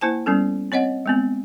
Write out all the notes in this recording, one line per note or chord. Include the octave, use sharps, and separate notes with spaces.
A#3 E4 C5 G#5 A5
G3 B3 C#4 A4
C4 C#5 D#5 F#5
G#3 B3 C4